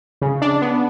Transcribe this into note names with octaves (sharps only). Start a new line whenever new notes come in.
C#3
D4
B3